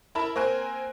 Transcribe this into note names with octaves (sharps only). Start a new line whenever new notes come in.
E4 A#4 A5 B5
A#3 C4 A#4 C5 G#5 F#6